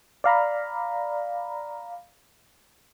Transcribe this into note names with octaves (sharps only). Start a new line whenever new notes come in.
D5 F5 A#5 B5